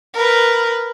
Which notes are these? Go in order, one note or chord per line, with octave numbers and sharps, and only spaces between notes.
A#4 B4